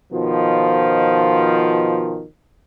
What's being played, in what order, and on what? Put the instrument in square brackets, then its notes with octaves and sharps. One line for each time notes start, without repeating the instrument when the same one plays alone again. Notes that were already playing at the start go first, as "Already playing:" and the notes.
[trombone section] B2 D#3 F3